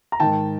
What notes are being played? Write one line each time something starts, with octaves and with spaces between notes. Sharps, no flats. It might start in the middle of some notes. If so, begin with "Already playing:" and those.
A#5
G#2 D#3 G5 A5